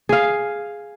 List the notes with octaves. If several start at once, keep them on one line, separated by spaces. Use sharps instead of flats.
G#4 F5